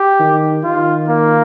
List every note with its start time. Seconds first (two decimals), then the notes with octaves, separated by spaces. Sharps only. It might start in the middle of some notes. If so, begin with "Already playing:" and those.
Already playing: G4
0.20 D#3
0.64 D#3 F4
1.08 A#3